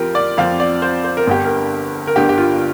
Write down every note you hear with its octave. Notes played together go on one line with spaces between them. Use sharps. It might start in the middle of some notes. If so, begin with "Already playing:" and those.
Already playing: F2 F3 C4 F4 G4 A#4
D5
F2 F3 C4 F5
D5
C5
C5
A#4
G1 G2 D3 G4
A#4
A#4
G1 G2 D3 G4
G4
F4